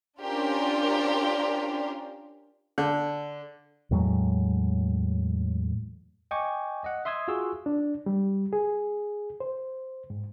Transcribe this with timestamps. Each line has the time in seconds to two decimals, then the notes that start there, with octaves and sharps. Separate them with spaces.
0.19 C#4 D4 F4 G4 A#4 C5
2.78 D3
3.91 E2 A2 F#3 G#3
6.31 D#5 G5 G#5 C#6 D6
6.84 D#5 F#5
7.05 E5 C6 D#6 E6 G#6
7.28 F4 F#4 G#4 E6
7.66 D4
8.06 G3
8.53 G#4
9.40 C5
10.10 G#2